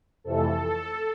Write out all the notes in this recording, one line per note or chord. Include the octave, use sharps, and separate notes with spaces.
F2 C3 E3 A3 A4